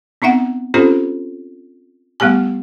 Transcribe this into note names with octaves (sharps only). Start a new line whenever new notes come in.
B3 C4 D#4 E5 F#5
C4 C#4 F4 G4 A4 C5
G3 A3 B3 G4 G#5